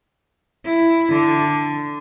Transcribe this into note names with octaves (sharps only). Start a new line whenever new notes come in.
E4
D3